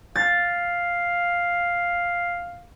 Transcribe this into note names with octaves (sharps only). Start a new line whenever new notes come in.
F5 A6